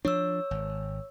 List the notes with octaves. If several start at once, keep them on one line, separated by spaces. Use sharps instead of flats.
F3 D4 C#5 E6
G#1